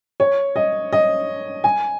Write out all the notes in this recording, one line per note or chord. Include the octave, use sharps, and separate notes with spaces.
C#5
D#5
D#5
G#5